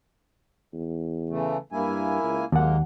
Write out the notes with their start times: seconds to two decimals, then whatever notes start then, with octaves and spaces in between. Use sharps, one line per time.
0.73 E2
1.29 C#3 E3 A3
1.72 G2 A#3 E4 G#5
2.23 C#2
2.52 D#2 F#3 G#3 A#3 F#5